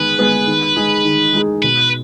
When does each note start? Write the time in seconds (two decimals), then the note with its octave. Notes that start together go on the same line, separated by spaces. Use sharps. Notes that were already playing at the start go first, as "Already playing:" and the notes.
Already playing: D#3 G#3 B3 G#4 B4
0.18 G#3 B3 G#4
0.47 D#3
0.76 G#3 D#4 G#4
1.05 D#3
1.33 G#3 D#4 G#4
1.62 B2 B4